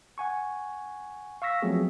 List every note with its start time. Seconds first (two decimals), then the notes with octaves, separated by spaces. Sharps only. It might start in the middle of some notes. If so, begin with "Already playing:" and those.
0.18 F#5 G#5 C#6
1.42 F5 C#6 E6 A#6 B6
1.62 F3 F#3 A3 B3 C4 G#4